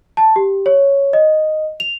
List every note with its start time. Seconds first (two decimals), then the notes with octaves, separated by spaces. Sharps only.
0.17 A5
0.36 G4
0.66 C#5
1.13 D#5
1.80 F7